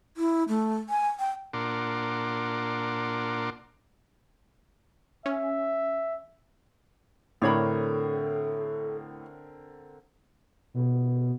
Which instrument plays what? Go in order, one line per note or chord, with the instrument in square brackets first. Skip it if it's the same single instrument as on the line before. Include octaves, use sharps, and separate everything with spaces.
[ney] E4
A3
G#5
G5
[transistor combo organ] A#2 D4 A#4 F#5 C6 D6
[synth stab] C#4 [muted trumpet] E5
[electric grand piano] A2 [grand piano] D3 C4 A#4 [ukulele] D4 C#5 B5 [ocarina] A4
[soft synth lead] B2